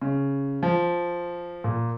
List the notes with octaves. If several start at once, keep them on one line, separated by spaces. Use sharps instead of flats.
C#3
F3
A#2